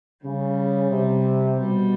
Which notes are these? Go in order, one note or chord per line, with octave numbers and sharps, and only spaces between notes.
C#3 G3
C3
B2 G3